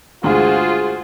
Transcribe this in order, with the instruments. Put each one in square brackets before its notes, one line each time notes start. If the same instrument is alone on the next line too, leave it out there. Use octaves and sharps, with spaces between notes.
[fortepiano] D2 G2 G#3 [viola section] F4 G#4 [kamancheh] F#4 C5